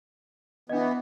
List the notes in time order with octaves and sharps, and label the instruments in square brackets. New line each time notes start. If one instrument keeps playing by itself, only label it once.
[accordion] E3 B3 [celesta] D4 D#5